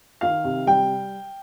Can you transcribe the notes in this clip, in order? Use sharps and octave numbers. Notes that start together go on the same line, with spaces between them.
D#3 F5
C3
G3 G5